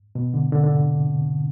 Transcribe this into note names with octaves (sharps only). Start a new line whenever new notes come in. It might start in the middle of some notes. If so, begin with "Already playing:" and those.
B2
D3
D3
D3
C3